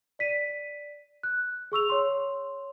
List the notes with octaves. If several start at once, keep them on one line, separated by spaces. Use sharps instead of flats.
D5 B6 D#7
F#6
G#4 C#6 E6 F7
C#5 C6